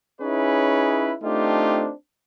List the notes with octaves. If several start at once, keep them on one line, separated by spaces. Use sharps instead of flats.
C#4 D#4 E4 G#4 B4 C#5
A3 C4 D4 D#4 F4 G4